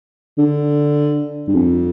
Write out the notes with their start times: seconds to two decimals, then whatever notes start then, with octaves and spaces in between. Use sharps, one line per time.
0.38 D3
1.48 G2
1.54 F2